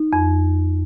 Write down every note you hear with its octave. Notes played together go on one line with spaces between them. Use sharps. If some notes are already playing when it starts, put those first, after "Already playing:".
Already playing: D#4
F2